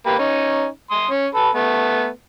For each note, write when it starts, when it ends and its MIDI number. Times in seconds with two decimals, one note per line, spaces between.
0.06 0.16 58
0.06 0.16 67
0.06 0.16 71
0.19 0.67 61
0.19 0.67 63
0.91 1.07 84
0.91 1.07 87
1.11 1.26 61
1.35 1.49 69
1.35 1.49 71
1.55 2.08 57
1.55 2.08 59